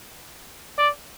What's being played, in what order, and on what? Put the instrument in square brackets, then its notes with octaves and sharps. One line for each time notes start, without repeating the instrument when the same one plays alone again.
[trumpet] D5